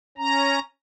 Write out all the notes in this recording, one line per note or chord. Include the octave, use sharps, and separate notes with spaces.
C#4 A#5